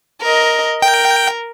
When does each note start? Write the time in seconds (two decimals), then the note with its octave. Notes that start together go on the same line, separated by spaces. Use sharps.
0.22 A#4 D#5
0.82 A#4 G5